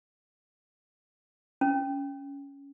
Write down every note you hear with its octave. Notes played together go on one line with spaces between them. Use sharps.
C#4